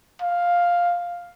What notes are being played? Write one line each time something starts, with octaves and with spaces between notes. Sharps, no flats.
F5